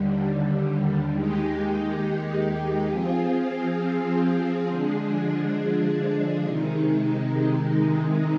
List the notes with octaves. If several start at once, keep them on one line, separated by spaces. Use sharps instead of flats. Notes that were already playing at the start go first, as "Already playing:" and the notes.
Already playing: D#2 D3 G3
D#2 D#3 G#3 D#4 G4
F3 C4 F4 G#4
D3 F3 G#3 D4 G#4
C3 D#3 G#3 D#4